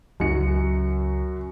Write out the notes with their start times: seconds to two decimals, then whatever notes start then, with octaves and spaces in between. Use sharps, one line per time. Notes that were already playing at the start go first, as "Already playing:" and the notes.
0.20 C#2 F#2 F#4 C#7